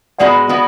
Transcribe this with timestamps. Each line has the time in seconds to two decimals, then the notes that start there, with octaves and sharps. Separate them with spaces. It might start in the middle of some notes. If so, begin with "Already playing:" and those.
0.19 G#2 G#3 B3 F#4 D5 F#5
0.49 G#3 B3 F#4